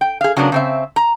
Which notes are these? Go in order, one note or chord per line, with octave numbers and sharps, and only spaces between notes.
G5
G#4 F5
C#3 F#3 A#3 B3 D4
C#3 C4 E5
A#5